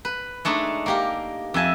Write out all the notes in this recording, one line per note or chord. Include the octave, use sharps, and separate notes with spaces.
B4
G#3 A3 D4 D#4
A#3 G4 A#4
F2 E5 G#5 A5